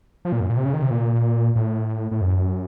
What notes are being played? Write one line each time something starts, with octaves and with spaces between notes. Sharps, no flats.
F3
A#2
F#2
A#2
C3
C#3
D#3
C3
A#2
A2
A2
F#2